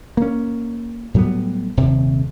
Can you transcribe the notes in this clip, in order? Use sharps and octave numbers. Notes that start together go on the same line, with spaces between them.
A#3 C#4
A2 F#3 G3 B3
D#1 C3